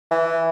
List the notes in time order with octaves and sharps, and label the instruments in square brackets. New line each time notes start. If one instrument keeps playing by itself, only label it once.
[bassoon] E3